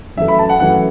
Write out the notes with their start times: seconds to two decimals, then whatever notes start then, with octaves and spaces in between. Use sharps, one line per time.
0.17 F#2 E3 A3 E5
0.28 B5
0.39 A5
0.49 F#5
0.60 F#2 E3 A3 F#5